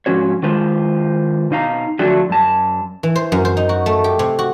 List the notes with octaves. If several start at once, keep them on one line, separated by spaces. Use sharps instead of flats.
G#2 F3 C#4 F#4 C#5
D#3 G#3 F4 B4 C5
B2 D#4 F5 A#5
D3 F3 F#3 A3 D4 F#4
F#2 A5
E3
C5
F#2
C5
D#4
F#4
A3
G4
C3
F#4